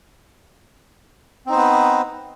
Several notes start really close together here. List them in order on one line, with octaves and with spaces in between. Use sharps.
C4 D#4 C5 B3 B4